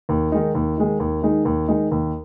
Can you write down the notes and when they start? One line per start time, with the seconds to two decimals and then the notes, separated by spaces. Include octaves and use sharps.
0.09 D#2
0.32 D#3 G#3 D#4
0.55 D#2
0.77 D#3 G#3 D#4
1.00 D#2
1.22 D#3 G#3 D#4
1.45 D#2
1.68 D#3 G#3 D#4
1.91 D#2